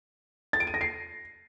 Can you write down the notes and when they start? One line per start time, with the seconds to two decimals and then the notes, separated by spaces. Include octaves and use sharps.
0.53 A6
0.60 D7
0.67 D#7
0.74 A#6
0.81 C7